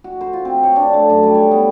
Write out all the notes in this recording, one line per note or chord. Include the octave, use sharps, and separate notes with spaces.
F#4
C5
F4
C4
C#5
D4
A3
F#2
G3
C#5
B3